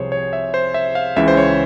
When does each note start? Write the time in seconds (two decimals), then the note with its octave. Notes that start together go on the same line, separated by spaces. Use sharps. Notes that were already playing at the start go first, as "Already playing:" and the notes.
Already playing: C2 C3 F3 G#4 C5 C#5
0.12 C#5
0.33 E5
0.54 C5
0.74 E5
0.95 F5
1.16 C#2 C#3 E3 E5
1.28 C5
1.37 C#5